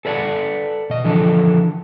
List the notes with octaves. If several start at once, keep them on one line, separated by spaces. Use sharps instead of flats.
A4 B4 D5 E5 F#5 A5
B2 D#5
D3 E3 F3 A4